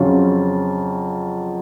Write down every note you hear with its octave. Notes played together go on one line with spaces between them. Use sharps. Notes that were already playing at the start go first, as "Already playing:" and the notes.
Already playing: F2 C#3 F#3 C#4 F4